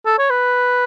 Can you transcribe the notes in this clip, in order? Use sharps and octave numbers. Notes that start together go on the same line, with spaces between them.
A4
C#5
B4